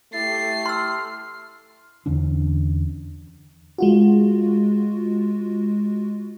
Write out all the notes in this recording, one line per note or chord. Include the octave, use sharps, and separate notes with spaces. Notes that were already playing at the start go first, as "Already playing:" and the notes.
A3 E4 G4 A6 C7
C6 E6 F6
E2 D3 C#4 D4
G#3 F4 F#4